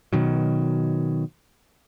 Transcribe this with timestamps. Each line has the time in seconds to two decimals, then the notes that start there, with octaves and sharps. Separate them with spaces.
0.13 B2 D#3 F#3